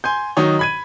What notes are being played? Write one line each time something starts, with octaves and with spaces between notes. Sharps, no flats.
G#5 C6 G6
D#3 F#3 D#4 C#5
B5 G#6 D#7